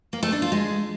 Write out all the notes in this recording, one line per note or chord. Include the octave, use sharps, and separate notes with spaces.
A#3
A3
D4
F4
G#3